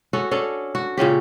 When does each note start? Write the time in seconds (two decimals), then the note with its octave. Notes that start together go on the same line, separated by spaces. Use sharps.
0.13 C#4 F#4 A4
0.31 C#4 D4 A4
0.75 F#4
0.97 A#2 C#3 C#4 G4